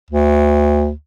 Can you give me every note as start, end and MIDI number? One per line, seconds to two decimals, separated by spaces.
0.10 0.91 38